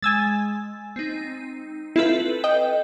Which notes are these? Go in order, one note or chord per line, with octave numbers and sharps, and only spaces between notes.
G#3 G#5 E6 A6
C4 D#4
C4 E4 F4 A4 B4
D#5 G5